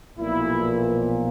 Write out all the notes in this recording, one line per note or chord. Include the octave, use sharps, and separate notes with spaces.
B1 A#2 F3 E4